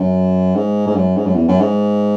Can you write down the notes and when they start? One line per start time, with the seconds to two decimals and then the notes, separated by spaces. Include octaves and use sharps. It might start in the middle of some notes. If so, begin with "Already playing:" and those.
Already playing: F#2
0.56 G#2
0.87 G#2
0.95 F#2
1.17 G#2
1.26 F#2
1.35 E2
1.48 F#2
1.61 G#2